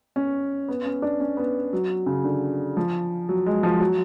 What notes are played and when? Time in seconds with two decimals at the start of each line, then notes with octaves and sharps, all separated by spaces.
0.16 C#4
0.68 B3
0.85 C#4
1.02 D4
1.20 C#4
1.37 B3
1.73 F#3
2.06 C#3
2.24 D3
2.77 F3
3.29 F#3
3.46 G#3
3.63 F3
3.80 F#3